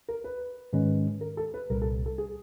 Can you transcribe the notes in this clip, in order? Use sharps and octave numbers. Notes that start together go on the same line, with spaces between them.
A#4
B4
G#2 D#3 G#3 C#4 B4
A#4
A4
B4
C2 A#2 G3 A#4
A4
A4
G#4